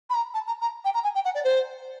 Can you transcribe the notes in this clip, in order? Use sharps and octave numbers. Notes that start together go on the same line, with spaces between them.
B5
A#5
A5
A#5
A#5
G5
A#5
G#5
G5
F#5
D5
C5